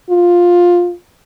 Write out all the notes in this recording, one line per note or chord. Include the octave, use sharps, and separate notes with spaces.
F4